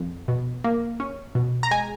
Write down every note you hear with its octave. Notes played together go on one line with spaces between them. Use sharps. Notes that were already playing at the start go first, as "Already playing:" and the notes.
Already playing: F2
B2
A#3
C#4
B2
A#5
G#3 G#5